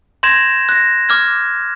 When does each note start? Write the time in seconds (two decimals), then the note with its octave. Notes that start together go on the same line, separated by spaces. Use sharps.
0.23 C6 G6 G#6 A#6 E7
0.69 F#6 A#6
1.09 D6 F6 G#6